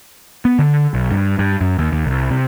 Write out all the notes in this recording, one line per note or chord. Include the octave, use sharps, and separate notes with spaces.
B3
D3
B1
G2
G2
F#2
D#2
D#2
C2
C3